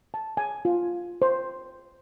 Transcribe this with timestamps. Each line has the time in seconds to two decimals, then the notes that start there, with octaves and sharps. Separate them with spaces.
0.14 A5
0.37 G#5
0.65 F4
1.22 C5